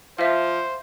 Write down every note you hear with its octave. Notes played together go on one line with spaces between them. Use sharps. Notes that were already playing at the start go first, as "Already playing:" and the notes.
F3 C5 E5 F5